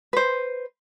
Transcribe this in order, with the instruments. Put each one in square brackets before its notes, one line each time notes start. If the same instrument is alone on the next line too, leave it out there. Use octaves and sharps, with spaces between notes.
[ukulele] B4 C5